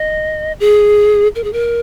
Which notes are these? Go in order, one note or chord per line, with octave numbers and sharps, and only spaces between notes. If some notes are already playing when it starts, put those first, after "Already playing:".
Already playing: D#5
G#4
A#4
G#4
A#4